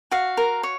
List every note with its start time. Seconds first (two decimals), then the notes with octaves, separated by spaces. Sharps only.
0.11 F#4 F5
0.37 A#4
0.63 C#5